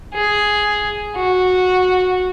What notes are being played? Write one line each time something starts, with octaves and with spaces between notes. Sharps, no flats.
G#4
F#4